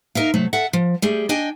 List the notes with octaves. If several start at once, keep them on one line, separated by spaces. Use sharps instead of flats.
D#4 A#4 E5 F5
C3 F#3 A3
A4 E5 F#5
F3
G3 A3 G#4
D4 D#5 G5 G#5